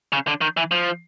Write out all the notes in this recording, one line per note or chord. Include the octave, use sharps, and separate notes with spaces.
C#3
D3
D#3
E3
F3